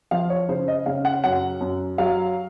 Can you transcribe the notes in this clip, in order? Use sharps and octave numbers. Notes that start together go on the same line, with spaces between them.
F3 F5
C#5
C#3 C5
D#5
C#3 F5
F#5
F#2 F#5
F#2
F#3 F5